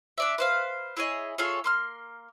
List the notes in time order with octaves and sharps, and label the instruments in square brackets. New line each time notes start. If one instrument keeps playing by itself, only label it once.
[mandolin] D4 D5 E5
B4 C5 F5
E4 G#4 C#5 D#5
F4 G#4 A4 C#5
A#3 C6 F6